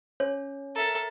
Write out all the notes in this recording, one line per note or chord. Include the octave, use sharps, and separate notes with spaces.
C#4 C#5
A4 A#4 E5 A#5